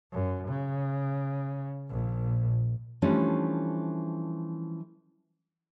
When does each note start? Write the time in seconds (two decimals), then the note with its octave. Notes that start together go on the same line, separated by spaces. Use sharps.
0.12 F#2
0.48 C#3
1.90 A#1 A#2
3.02 E3 F3 G3 A3 C#4 D4